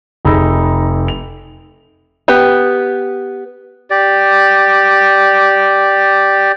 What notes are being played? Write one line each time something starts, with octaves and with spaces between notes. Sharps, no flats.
F1 D#4 G#4 B5 E6 A#6
F7
B3 G4
G4 D5